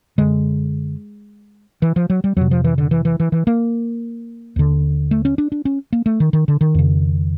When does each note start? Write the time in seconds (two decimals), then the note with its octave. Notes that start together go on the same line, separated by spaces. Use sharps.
0.18 F#2 D3 G#3
1.82 E3
1.96 F3
2.10 F#3
2.24 G3
2.36 F2 C3 F#3
2.51 F3
2.64 E3
2.78 D3
2.91 E3
3.05 E3
3.20 E3
3.32 E3
3.47 A#3
4.56 D#2 D3
5.11 A3
5.25 C#4
5.38 D4
5.52 D4
5.65 C#4
5.93 A#3
6.06 A3
6.20 D#3
6.33 D#3
6.48 D3
6.61 D#3
6.75 F2 C#3